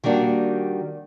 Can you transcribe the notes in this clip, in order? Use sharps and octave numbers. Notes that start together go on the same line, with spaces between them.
D#3 G3 A#3 D4 F#4